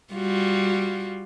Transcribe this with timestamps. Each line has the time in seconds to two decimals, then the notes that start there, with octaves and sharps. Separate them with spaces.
0.14 G3 F4 F#4